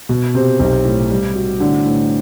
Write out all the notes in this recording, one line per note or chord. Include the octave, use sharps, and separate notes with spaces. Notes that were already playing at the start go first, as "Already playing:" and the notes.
B2
C3 C4
B1 C3
A2
G3
F#4
A2 D3
A2